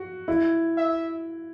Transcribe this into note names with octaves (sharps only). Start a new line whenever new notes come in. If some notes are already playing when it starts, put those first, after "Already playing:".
Already playing: F#4
E4
E5